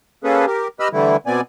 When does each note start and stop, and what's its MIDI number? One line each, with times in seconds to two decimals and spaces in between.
0.24 0.46 58
0.24 0.46 61
0.24 0.46 68
0.24 0.46 69
0.24 0.46 71
0.47 0.68 67
0.47 0.68 70
0.80 0.88 67
0.80 0.88 71
0.80 0.88 75
0.80 0.88 83
0.80 0.88 88
0.80 0.88 89
0.93 1.17 50
0.93 1.17 52
0.93 1.17 55
0.93 1.17 57
0.93 1.17 64
1.26 1.41 47
1.26 1.41 59
1.26 1.41 60
1.26 1.41 74
1.26 1.41 80